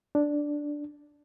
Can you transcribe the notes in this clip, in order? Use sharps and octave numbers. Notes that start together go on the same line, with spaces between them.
D4